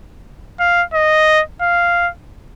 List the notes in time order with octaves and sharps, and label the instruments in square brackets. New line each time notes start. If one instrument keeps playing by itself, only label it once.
[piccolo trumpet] F5
D#5
F5